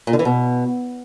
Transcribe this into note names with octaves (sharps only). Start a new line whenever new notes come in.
A#2
D3
E3
B2